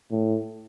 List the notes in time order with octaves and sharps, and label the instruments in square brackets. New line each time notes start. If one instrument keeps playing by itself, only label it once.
[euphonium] A2